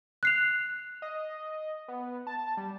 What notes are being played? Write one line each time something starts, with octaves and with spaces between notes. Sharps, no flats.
F#6 C7 F7
D#5
B3
A5
G3